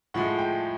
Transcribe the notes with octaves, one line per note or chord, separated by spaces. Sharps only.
A2 F3 G#3 F#5
G5